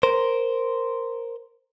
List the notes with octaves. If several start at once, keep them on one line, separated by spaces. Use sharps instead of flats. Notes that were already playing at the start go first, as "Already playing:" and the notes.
A#4 C5